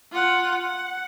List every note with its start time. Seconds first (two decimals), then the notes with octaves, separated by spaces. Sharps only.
0.12 F4 F#5
0.61 F#5